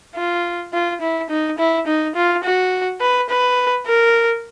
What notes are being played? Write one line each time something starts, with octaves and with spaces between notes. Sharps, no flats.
F4
F4
E4
D#4
E4
D#4
F4
F#4
B4
B4
A#4